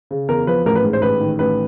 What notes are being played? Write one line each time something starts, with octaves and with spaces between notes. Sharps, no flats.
C#3
E2 A#4
F3 B4
A1 A#4
B4
G#2
C5
A1 B4
D#3
A1 B4